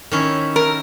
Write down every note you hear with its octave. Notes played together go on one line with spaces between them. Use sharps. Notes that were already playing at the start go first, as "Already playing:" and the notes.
D#3 C#4 E4
A#4